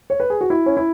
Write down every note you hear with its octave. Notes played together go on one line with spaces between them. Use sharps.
C#5
B4
G#4
F#4
E4
C#4
E4